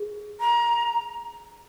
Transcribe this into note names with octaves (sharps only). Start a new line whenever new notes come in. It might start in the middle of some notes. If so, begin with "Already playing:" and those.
Already playing: G#4
A#5